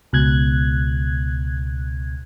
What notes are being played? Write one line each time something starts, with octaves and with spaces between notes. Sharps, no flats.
C#2 B2 F#6 G#6